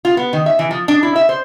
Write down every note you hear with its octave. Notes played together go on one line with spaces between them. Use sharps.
F4
B3
D#3
E5
E3
F3
D4
E4
E5
C5